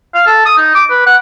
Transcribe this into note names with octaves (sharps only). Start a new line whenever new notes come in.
F5
A4
D#6
D#4
D6
B4
F#5